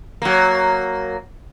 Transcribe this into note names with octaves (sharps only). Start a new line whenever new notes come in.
F#3 A#3